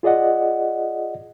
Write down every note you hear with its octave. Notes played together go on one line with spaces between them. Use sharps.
F4 G#4 D5 D#5 F#5